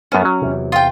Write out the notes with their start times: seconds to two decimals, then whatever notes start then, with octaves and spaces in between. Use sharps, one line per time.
0.12 F#2 B3 C#4 A5
0.25 F#3
0.42 E2 C3
0.72 F4 G5